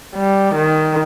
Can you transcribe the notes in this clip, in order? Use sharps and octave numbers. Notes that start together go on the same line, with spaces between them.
G3
D#3